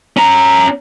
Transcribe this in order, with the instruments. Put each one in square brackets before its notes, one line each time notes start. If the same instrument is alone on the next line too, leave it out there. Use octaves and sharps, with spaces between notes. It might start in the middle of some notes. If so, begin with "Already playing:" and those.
[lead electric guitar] C#4 A#5